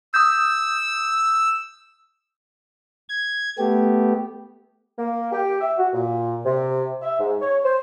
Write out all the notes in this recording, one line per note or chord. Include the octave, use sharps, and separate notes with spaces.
D#6 E6 G6
G#6
A3 B3 G4
A#3
G4
E5
F#4
A#2
C3
E5
G#2
C#5
C5